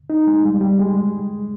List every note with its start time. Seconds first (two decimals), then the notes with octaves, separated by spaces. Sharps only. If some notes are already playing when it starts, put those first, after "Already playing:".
0.10 D#4
0.27 G#3
0.44 G3
0.61 G3
0.79 G#3